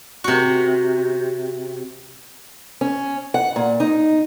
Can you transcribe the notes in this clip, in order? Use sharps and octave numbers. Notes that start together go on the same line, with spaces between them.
C3 F#4
C#4
F#5
A#2
D#4